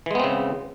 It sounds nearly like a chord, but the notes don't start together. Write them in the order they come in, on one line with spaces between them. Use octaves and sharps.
E3 G#3 B3 C4 C#3